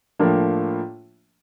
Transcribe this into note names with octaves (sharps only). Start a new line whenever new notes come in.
A2 F3 A#3 D4